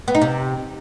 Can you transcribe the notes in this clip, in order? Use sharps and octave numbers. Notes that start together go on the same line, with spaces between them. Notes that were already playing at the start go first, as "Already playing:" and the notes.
B3
D#4
C3